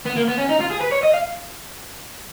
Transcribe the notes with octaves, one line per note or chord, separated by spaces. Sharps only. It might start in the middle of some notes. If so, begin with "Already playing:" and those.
B3
A#3
B3
C#4
D#4
F4
G#4
B4
C#5
D#5
F5